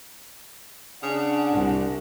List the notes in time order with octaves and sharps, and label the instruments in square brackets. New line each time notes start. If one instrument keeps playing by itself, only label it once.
[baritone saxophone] C#3 [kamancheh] D4 F#5
[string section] C2